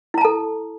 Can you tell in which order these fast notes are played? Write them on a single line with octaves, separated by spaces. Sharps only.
E4 A#5 A5 A4